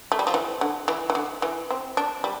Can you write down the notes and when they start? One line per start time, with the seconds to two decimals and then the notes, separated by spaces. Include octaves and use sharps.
0.12 A3
0.19 G3
0.27 F3
0.34 E3
0.61 D3
0.88 E3
1.10 E3
1.15 D3
1.42 E3
1.71 C4
1.97 D4
2.24 G3